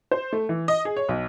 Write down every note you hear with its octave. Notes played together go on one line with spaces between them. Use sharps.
C5
A3
E3
D#5
G#4
C#5
B1